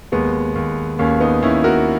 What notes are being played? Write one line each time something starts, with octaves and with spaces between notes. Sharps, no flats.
D#2 G#3 B3
D#2
D#2 A#3 C#4
B3 D#4
D#2 C#4 E4
F#4 A#4